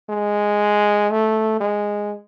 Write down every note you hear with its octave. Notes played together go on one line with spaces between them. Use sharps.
G#3
A3
G#3